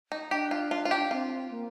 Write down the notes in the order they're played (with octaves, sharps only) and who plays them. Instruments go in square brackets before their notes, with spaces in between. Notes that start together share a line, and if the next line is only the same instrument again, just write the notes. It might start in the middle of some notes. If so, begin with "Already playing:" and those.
[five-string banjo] D#4
[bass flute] D4 [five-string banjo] G4
[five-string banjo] F4
F4
F4
G4
[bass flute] C4 [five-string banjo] F4
[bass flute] A#3